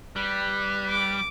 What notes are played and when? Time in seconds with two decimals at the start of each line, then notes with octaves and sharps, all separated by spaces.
0.16 G3 B4
0.90 D6